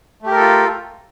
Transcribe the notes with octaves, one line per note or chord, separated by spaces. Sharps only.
A3 F4 G4 A4 A#4